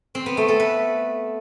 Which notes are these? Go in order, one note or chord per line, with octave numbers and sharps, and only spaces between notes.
C4
B3
A3
A4
B4